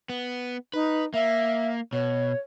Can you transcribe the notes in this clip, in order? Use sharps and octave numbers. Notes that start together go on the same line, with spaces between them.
B3
D#4 B4
A#3 E5
B2 C#5